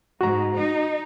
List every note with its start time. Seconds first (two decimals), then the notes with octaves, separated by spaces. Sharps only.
0.21 G#2 F#4 A#5
0.56 D#4